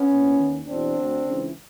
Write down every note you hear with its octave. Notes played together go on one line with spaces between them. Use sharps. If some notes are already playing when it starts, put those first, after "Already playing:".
Already playing: B3 C#4
C2 A#2
D#2 D#3
E2 B2 C4 D4
D2 D3
C#2 C#3 E3